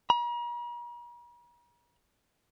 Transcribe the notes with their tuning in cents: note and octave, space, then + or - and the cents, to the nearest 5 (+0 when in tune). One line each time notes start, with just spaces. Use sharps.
A#5 +45